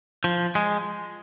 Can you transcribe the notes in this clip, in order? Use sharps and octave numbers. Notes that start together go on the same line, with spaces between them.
F3
G#3